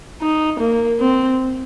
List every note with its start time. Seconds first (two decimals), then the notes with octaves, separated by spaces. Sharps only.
0.22 D#4
0.60 A#3
1.00 C4